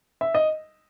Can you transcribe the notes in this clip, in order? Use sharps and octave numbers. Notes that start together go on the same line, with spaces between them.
E5
D#5